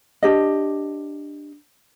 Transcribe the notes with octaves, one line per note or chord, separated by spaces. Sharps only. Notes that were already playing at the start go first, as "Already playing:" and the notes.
D4 G4 D#5